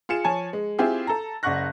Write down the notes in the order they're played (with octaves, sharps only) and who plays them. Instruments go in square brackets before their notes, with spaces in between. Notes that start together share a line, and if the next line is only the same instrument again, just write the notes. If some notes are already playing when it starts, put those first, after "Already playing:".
[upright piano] F4 G#4 C#7 E7
F3 C#5 G#5 A5
G#3
C4 E4 F4 G4 G#4
A4 A#5
F#1 D5 F#5 C#6 F#6 A#6